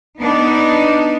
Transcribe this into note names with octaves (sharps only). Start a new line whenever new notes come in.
B3 D4 D#4